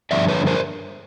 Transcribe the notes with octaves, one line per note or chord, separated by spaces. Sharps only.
G2 D3 F3 D5 E5
B4 C#5
A#4 C5